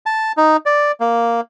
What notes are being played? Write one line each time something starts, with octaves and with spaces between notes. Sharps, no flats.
A5
D#4
D5
A#3